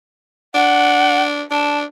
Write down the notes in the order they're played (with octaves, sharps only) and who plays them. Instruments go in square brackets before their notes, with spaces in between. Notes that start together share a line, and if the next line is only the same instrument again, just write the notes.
[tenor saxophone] D4 [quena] F#5
[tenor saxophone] D4 [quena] A5